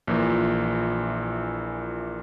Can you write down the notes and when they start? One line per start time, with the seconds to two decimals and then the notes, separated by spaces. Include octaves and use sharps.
0.07 A#1 A#2 E3